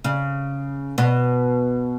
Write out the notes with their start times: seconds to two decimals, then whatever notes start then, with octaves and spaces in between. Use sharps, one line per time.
0.04 C#3
0.98 B2